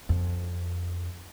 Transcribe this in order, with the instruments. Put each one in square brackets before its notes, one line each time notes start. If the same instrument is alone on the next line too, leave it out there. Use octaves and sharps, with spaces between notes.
[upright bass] F2